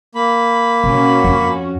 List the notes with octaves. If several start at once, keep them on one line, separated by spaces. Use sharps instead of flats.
A#3 B5
B2 C#4 F#4
F2